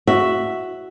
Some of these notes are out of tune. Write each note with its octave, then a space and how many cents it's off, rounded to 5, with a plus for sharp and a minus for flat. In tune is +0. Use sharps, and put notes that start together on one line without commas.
F#4 +0 E5 +0